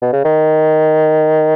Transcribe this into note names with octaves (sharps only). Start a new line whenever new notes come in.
B2
C#3
D#3